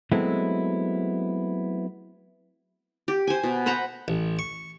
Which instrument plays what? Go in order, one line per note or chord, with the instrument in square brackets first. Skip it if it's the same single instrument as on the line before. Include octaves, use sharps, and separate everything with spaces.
[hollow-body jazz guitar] F#3 G#3 A3 B3 C4 E4
[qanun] G4
C5 G#5
B2
B4 C5 F#5 A#5
[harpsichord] A1
C#6